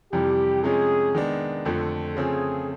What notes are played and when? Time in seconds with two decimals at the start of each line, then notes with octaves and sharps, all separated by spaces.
0.12 F2 C3 E3 G3 G4
0.63 C3 F3 G#3 C#4 G#4
1.14 D#3 G#3 B3 D4
1.65 F2 D3 F3 A3 C4
2.16 C#3 F3 A3 C4 G#4